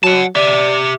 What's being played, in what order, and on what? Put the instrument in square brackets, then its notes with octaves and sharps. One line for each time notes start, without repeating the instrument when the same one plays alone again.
[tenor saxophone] F#3 [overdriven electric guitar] F#5 A5
[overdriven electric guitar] G4 E5 [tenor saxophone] D5